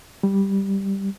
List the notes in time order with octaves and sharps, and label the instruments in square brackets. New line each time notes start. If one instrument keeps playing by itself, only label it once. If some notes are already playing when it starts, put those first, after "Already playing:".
[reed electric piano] G3